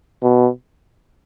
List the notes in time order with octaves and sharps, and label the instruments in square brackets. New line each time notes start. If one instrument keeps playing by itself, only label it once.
[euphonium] B2